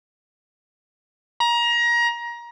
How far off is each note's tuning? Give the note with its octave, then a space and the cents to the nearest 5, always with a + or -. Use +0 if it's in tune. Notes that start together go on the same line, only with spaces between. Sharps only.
A#5 +25